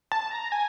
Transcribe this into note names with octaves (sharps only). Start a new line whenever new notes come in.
A5
A#5
G#5